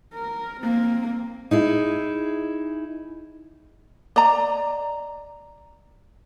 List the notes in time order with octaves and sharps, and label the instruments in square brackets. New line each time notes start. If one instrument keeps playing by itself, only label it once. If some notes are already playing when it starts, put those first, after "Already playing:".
[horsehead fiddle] A#4
A#3 C4
[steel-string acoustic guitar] D#4 E4 G#4
[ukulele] D5 D#5 A#5